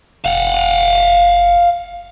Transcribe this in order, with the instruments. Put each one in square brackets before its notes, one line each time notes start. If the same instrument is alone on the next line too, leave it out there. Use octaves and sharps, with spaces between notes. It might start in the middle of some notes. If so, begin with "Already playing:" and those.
[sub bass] F#1 [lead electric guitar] F5 F#5